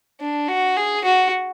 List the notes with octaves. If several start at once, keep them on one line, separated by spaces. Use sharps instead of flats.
D4
F#4
G#4
F#4